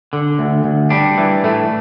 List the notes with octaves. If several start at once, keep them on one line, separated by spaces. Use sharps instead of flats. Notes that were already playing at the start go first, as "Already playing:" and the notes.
D3
D2
D2
G3 D4
E3
A2 A3